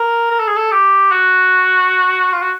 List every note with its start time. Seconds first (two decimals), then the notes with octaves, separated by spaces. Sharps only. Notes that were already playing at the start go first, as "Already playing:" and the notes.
Already playing: A#4
0.31 A#4
0.39 A4
0.47 G#4
0.56 A4
0.71 G4
1.11 F#4
2.33 F4
2.42 F#4